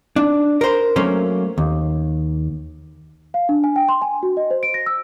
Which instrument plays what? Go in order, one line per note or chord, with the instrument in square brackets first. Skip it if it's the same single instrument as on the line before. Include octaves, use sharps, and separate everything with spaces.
[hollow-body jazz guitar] D4
A#4 C5
F#3 A3 A#3 C#4 C5
D#2
[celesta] F5
D4
G#5
G5
C6
G#5
F#4
D#5
C5
D7
A#6
E6